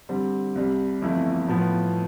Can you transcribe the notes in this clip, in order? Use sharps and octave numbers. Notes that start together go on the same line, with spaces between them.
D3 G3 C4
C2 C3 G3
G1 F2 E3 A3 E4
A2 F3 B3